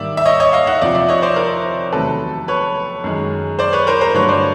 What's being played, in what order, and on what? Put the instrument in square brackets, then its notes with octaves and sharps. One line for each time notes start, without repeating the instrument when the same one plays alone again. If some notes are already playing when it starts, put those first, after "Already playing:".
Already playing: [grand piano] G#2 D#3 G3 A#3 D5 E5
E5
C#5 D#5
C#5 D#5
D#5 F5
E5 F#5
F2 C3 F3 D5 E5
D5 E5
C#5 D#5
C5 D5
A#4 C5
E2 C3 D#3 F#3 A3 A4 B4
B4 C#5
F#2 D#3 G#3
C5 D5
B4 C#5
A#4 C5
A#4 C5
G2 D3 F#3 A3 B4 C#5
C5 D5